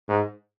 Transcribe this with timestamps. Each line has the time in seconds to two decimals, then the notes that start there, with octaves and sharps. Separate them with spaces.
0.08 G#2